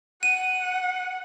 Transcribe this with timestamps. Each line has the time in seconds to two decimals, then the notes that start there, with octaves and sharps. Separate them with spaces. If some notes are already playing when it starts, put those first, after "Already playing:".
0.23 F#5 D#7